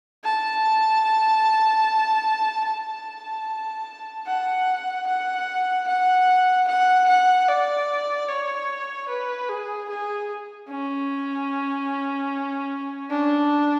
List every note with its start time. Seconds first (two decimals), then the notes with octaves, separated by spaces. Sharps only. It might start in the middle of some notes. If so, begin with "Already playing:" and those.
0.24 A5
2.67 A5
4.27 F#5
5.07 F#5
5.87 F#5
6.68 F#5
7.08 F#5
7.48 D5
8.28 C#5
9.08 B4
9.49 G#4
9.89 G#4
10.69 C#4
13.10 D4